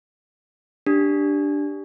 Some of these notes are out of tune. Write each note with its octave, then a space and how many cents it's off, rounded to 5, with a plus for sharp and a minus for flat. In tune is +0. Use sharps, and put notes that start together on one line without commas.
D4 +0 G4 +0